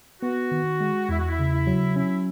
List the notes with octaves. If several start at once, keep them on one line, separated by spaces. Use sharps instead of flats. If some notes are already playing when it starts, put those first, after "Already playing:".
B3 F#4
D#3
G#3
E2 E4
F#4
E4
C#3
E4
F#3
C#4 E4